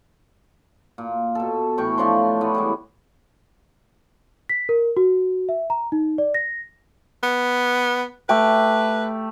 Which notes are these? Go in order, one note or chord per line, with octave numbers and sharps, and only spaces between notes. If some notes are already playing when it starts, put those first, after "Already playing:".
A#2
B2 A4
A2 E3 G5 C#6
F3 D4 C#5 C6
A3 B3 E4
E3 G3 G#3
B6
A#4
F#4
E5
A#5
D#4
D5
A#6
B3
A3 G4 B4 G5